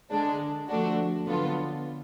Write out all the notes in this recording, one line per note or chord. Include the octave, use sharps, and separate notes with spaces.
D3 G#3 D4
F3 A3 D4 F#4
D3 F#3 B3 F4 A4